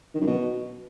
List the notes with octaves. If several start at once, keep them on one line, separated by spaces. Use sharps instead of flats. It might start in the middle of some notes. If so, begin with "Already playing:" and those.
D#3
F#2
B2